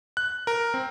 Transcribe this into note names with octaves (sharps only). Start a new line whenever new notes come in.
F#6
A#4
C4